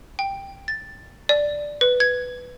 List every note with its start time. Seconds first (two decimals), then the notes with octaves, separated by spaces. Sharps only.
0.19 G5
0.68 A6
1.29 D5
1.81 B4
2.00 G#6